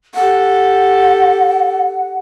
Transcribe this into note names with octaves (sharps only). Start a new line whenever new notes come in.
G4 A4 F#5